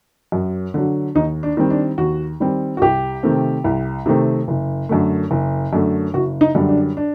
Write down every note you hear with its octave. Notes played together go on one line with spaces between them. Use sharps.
F#2
D3 F#3
D#2 D#4
D4
D#3 G3 C4
D4
D#2 F#4
D#3 G3 C4
F#4
C2 G4
C3 D#3 A3 C4
C2
C3 D#3 A3 C4
F#1
F#2 D3 A3
F#1
F#2 D3 A3
F#1 F#4
D#4
F#2 D3 G3
D4
D4